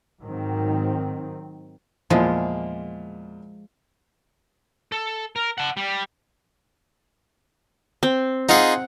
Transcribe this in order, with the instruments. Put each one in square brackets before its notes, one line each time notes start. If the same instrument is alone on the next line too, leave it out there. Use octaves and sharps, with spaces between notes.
[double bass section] G#2 D#3 F#3 C4
[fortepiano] E2 A#2 A#3 [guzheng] F3 G#3
[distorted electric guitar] A4
A#4
F#5 A5
G3
[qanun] C4
[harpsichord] D#4 F4 G#4 [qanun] F#5